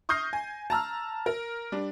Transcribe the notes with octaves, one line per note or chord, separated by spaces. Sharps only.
C#6 D#6 F6 G6 A#6 C7
G#5
A5 A#5 E6 F6
A#4
G3 D4